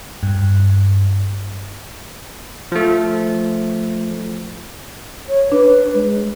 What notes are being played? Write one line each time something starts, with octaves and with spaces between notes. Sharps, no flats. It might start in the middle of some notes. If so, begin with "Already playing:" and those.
G2
F3 A3
C#5
D4 B4
G#3